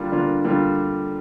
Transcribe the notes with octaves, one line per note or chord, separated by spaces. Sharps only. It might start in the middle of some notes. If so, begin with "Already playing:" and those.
Already playing: D3 G3 A#3 D4 F4
D3 G3 A#3 D4 F4
D3 G3 A#3 D4 F4